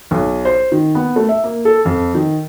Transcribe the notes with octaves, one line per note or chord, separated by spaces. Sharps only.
B1
C5
D#3
B3
A3
E5
A#3
A4
F2
D#3